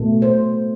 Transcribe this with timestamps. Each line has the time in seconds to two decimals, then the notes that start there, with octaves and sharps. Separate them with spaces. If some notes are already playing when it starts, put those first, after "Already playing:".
Already playing: B2 A3
0.22 C5